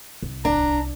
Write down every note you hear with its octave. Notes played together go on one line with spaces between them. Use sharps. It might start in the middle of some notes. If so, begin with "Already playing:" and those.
C2
D1 D4 A#5